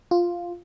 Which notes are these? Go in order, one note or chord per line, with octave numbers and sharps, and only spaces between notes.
F4